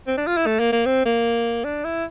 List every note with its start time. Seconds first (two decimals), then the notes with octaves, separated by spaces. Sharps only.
0.07 C4
0.17 D4
0.27 F4
0.37 E4
0.46 A3
0.59 A#3
0.72 A#3
0.86 C4
1.05 A#3
1.64 D4
1.84 E4